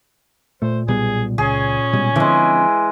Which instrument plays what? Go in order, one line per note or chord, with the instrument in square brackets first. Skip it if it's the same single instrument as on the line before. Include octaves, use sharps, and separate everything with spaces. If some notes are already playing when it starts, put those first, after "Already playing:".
[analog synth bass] A#2 [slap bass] A3 [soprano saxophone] C5
[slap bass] B1 G3 B3 [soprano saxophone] G#4
[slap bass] C#2 [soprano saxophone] C#4 [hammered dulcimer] G#4
[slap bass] B2 G3 G#3
[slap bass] D3 F3 C4 [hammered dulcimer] E3 G#3